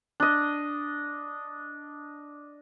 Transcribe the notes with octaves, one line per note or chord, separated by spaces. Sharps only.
D4 D#5